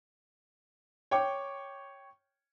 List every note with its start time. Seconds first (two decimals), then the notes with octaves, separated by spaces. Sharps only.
1.11 C#5 G5 C#6 D6